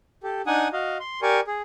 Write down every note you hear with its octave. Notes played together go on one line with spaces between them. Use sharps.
G4 A4
D4 D#4 F#5 G#5 D#6
F#4 D#5 F5
C6
G4 A#4 D5 G#5 C#6
G#4